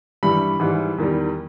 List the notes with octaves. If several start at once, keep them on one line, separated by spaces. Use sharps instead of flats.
G2 E3 G3 B5
G#2 E3 G3
E2 D#3 G3